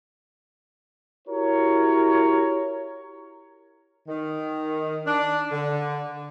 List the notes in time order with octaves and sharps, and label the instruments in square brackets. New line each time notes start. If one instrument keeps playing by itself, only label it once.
[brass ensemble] E4 F#4 G4 A#4 C#5
[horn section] D#3
D4
D3